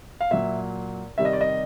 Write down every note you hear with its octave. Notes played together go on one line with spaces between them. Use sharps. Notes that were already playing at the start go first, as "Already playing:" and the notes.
F5
A#2 F#3 E5
C3 D#3 G3 E5
D#5
D5
D#5